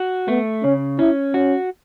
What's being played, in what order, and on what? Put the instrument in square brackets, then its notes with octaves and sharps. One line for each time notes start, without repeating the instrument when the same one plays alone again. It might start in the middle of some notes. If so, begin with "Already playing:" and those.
Already playing: [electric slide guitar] F#4
[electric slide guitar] A3 [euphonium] B3
[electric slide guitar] C#3 [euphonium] C#4
[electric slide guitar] C#4 [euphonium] E4
[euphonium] C#4 [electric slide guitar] F#4